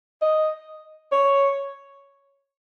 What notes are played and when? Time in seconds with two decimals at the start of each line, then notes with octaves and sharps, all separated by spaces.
0.22 D#5
1.12 C#5